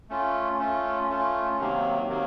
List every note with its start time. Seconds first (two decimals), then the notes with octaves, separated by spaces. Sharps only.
0.09 A3 C#4 F4
0.59 A3 C#4 F4
1.09 A3 C#4 F4
1.59 C3 D#3 F#3 A#3
2.08 C3 D#3 F#3 A#3